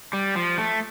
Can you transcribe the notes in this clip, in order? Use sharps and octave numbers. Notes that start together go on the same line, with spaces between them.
G3
F3
A3